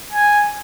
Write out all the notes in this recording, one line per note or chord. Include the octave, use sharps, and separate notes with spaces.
G#5